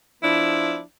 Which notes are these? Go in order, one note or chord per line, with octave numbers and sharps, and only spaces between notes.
F3 B3 D4 E4